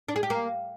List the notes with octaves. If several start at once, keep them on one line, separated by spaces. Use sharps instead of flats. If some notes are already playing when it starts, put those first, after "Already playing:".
D4
G#4
G4
A#3